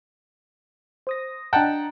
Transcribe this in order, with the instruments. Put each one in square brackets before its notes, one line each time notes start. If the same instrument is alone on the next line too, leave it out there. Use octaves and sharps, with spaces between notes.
[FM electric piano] C5 D#6 A#6
[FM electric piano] D4 D#5 A#5 [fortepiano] F#5 G5 A5